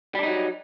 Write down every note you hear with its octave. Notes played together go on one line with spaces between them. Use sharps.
F#3 G3 D4 D#4